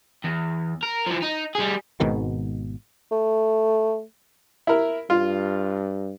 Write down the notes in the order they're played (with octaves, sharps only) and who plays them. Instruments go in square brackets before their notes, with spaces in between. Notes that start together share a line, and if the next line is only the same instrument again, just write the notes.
[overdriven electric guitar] E2
A#4
E3 F3
D#4
G3 G#4
[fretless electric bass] G#1 G#2 B2 D#3
[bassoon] A3
[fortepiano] E4 A#4
[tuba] G2 [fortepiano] F4